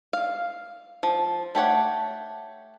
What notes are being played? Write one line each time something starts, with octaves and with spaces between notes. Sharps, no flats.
F5
F3
A3 G4 C#5 F#5